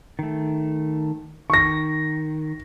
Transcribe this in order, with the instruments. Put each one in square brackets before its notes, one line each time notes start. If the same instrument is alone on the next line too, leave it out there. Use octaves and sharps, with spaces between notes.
[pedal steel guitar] D#3 A3
[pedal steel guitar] D#3 [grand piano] C#6 A#6